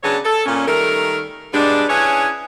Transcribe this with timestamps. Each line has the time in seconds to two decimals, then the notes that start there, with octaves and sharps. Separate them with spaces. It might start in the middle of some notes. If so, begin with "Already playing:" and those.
0.03 C#3 F#3 B3 D4 G#4 C#5
0.24 A4
0.46 A#2 C#4
0.67 D#3 G3 A3 A#4
1.53 G3 G#3 B3 D4
1.89 C#4 D4 E4 G#4 B4 C#5